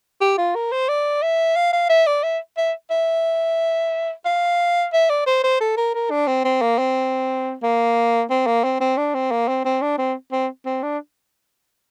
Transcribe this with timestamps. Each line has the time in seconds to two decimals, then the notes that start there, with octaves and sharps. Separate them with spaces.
0.21 G4
0.38 F4
0.55 A#4
0.72 C5
0.89 D5
1.22 E5
1.56 F5
1.73 F5
1.89 E5
2.07 D5
2.23 E5
2.57 E5
2.91 E5
4.25 F5
4.93 E5
5.10 D5
5.26 C5
5.43 C5
5.60 A4
5.77 A#4
5.94 A#4
6.11 D4
6.27 C4
6.45 C4
6.61 A#3
6.78 C4
7.63 A#3
8.30 C4
8.47 A#3
8.64 C4
8.81 C4
8.97 D4
9.14 C4
9.31 A#3
9.48 C4
9.65 C4
9.82 D4
9.99 C4
10.32 C4
10.66 C4
10.83 D4